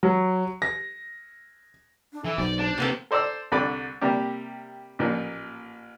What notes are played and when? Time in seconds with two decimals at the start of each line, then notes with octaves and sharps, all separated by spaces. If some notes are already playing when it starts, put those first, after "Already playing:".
0.03 F#3
0.62 A#6
2.13 D4
2.25 E3 A4
2.38 B1 C5 D5
2.59 D4
2.78 C3 A#3 B3 G4 A4
3.11 A4 C5 D5 A#5 E6
3.52 C2 D3 B5 D6
4.01 C3 G3 A#3 G4
4.99 A1 A#2 F3 A#3